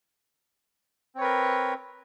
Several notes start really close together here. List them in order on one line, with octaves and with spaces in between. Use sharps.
C4 C#5 B4 A#4